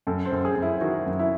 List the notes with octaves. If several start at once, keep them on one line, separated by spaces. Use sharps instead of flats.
F#2 A4
C5
F#2
G#4
F#2
E4
D#3 F#4
F#2
E4